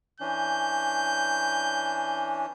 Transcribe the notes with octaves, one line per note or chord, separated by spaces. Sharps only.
E3 C#4 D4 G6